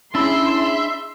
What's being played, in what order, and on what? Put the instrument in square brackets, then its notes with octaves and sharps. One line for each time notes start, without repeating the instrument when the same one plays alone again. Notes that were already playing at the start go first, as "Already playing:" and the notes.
[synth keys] C#4 E4 G#4 [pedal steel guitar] D4 B5 E6 [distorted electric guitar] E5 [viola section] C6